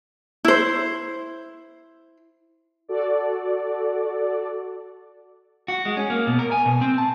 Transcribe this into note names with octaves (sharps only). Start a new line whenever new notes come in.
E4 C5
F#4 A4 D5
F#4
G#3
C#4
A#3
B2
A#4
G#5
B2
C4
A5